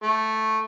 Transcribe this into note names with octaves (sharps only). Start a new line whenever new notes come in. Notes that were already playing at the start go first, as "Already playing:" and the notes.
A3